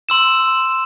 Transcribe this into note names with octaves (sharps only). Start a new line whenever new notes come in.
C6 E6 E7